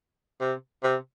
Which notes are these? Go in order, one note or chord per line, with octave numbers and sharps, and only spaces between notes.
C3
C3